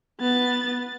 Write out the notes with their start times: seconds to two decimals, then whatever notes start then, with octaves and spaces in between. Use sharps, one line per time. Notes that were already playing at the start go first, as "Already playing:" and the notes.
0.20 B3 A6